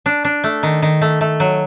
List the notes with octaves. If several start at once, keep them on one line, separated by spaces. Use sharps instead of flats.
D4
D4
A3
D#3
D#3
A3
A3
F#3